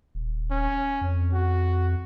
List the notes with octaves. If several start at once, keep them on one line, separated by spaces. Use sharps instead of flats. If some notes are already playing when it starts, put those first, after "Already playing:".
D#1
C#4
F2
F#4